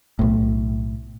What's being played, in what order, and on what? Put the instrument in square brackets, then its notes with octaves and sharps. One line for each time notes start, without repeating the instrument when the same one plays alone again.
[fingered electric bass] B1 A2